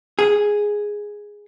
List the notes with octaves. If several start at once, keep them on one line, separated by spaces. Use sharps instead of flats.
G#4